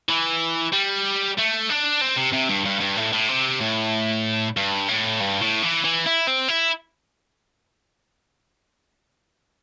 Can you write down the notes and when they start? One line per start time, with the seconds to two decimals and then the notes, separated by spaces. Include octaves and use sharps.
0.09 E3
0.73 G3
1.38 A3
1.69 D4
2.01 C4
2.16 C3
2.33 C3
2.49 G2
2.65 G2
2.81 G2
2.97 A2
3.13 A2
3.28 C3
3.61 A2
4.57 G2
4.88 A2
5.20 G2
5.42 A2
5.63 E3
5.84 E3
6.06 E4
6.27 C4
6.48 E4